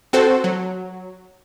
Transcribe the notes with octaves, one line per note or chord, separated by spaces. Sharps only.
C4 F#4 A4 C5
F#3